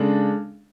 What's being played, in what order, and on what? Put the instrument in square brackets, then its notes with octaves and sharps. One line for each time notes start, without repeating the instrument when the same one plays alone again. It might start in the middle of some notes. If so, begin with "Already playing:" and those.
Already playing: [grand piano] C#3 G#3 D4 A4